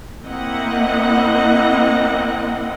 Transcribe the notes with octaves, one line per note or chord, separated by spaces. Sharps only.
A#3 C4 E4 D#5 F#5